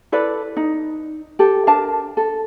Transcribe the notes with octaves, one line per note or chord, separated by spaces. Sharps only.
E4 A4 B4 D5
D#4
G4 A4
D4 A#4 A5
A4